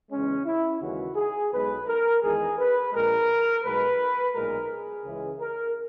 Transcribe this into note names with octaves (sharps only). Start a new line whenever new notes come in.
E2 C#3 G#3 C#4
E4
D#2 C#3 E3 G#3 F#4
G#4
B1 B2 G#3 B4
A#4
E2 D#3 G#3 G#4
B4
A#1 A#2 G#3 A#4
B1 B2 G#3 B4
B1 A#2 G#3 A#4
G#4
C#2 C#3 E3 G#3
A#4